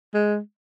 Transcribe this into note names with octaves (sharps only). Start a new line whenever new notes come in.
G#3